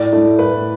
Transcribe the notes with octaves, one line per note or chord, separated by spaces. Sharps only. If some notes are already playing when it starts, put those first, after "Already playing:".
Already playing: A2 D5
A3 E4
A2 B4